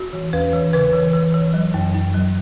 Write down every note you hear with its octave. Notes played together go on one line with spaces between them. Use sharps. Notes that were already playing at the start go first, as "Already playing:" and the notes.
Already playing: F#4
E3
E2 B4
E3
C#3 B4
E3
E3
E3
F#3
F#2
F#2
F#3